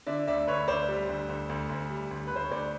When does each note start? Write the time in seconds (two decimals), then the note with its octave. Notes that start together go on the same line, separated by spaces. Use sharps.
0.07 D3 D5 E5
0.28 D2 D5 E5
0.47 D2 B4 C#5
0.68 D2 C5 D5
0.89 G3
1.09 D2
1.29 D2
1.49 D2
1.69 D2
1.90 G3
2.11 D2
2.27 B4
2.31 D2 C5
2.44 C#5
2.51 D2 C5 D5